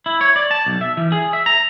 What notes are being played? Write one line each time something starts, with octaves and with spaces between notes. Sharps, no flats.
E4
C#5
D5
A5
B1
E5
E3
G#4
E5
A#5